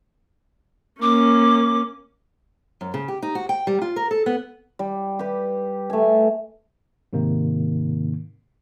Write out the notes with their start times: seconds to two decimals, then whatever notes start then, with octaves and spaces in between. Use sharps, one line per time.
1.02 A#3 C#4 D6
2.81 F#2
2.94 C#3
3.08 G4
3.22 D#4
3.35 F#4
3.49 G5
3.67 G3
3.81 F4
3.96 A#4
4.11 A4
4.26 B3
4.79 G3
5.19 G4 B4
5.90 A3 G#5
7.13 G#2 C3 D#3 A#3